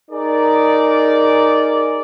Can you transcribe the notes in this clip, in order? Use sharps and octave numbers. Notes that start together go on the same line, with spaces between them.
D#4 G#4 A#4 D5